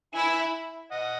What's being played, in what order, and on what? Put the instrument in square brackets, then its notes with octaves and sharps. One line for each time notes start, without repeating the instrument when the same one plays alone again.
[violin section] E4 [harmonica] E5 G#5
[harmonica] D#5 F#5